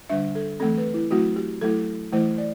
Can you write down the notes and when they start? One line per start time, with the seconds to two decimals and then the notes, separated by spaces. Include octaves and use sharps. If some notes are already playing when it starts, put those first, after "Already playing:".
0.09 D3 G3 D4 E5
0.35 A4
0.60 E3 A3 C4 A4
0.78 B4
0.94 E4
1.11 F#3 A3 C4 E4 F#4
1.36 G4
1.61 F#3 A3 E4 A4
2.12 E3 A3 E4 C5
2.38 D5